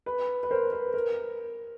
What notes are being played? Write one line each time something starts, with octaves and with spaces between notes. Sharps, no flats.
B4
B4
A#4 C5
B4
A#4